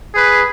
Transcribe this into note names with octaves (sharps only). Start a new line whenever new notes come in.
G#4 B4